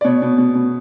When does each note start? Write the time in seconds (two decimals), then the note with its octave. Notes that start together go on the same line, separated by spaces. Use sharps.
0.01 D5
0.04 B2 C#5
0.22 B2
0.38 B2
0.55 B2